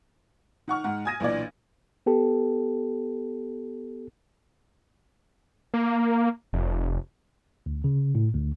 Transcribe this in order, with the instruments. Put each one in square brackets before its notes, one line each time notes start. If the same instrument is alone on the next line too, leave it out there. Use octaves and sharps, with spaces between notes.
[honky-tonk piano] D#3 F#5 C#6 F6
G#2 F#5
G#5 D#6 G#6 A#6 D#7
B1 A#2 E3 D4 D5
[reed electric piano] B3 G4 A4
[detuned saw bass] A#3
F1
[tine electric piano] D2
C#3
A2
D2